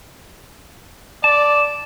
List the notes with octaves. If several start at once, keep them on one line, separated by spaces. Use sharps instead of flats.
D5 A5